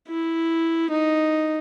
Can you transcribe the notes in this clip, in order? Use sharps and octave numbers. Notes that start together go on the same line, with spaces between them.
E4
D#4